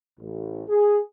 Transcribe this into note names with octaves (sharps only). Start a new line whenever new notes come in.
A1
G#4